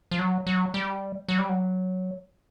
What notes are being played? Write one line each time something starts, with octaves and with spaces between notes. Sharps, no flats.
F3
F#3
F#3
G3
F#3
G3
F#3